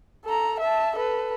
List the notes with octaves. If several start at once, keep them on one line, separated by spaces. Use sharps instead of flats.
A4 A#5
E5 A5
A4 B4